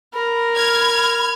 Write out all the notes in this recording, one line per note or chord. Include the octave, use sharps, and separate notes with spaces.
A#4 B5
F6 G#6